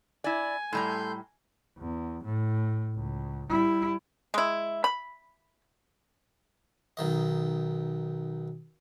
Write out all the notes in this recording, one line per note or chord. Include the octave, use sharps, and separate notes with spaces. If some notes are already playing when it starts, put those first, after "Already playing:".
E4 D5 G#5
A2 G3 A3 A#5 C6 G6
E2
A2
C#2
G3 E4
G#3 E4
B5
B1 D#3 D#5